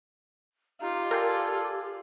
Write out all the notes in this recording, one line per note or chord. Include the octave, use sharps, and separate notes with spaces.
D#4 F4 G4
A4 A#4 D5 G5 G#5 C6